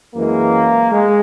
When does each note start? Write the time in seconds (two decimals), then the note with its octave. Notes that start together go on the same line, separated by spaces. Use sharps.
0.15 F#2 E3 G#3 A#3
0.92 G#3